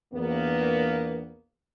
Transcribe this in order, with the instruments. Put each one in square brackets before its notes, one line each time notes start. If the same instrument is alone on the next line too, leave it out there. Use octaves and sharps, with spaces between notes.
[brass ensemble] A#1 E2 A#3 B3